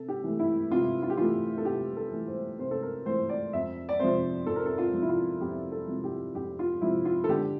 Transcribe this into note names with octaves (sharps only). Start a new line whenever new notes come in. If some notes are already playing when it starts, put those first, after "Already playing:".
Already playing: C3 A4
G4
E3 A3
E4
C3 F4
F4
G4
E3 A3 F4
A4
C3 G4
A4
E3 A3
C5
C3 C5
A4
A#4
E3 A3 C5
D5
F2 E5
D5
C3 F3 C5
F2 A4
A#4
A4
F4
C3 F3
E4
F4
F2 G4
A4
C3 F3
G4
F2 G4
F4
C3 F3 E4
F4
A4
D3 G4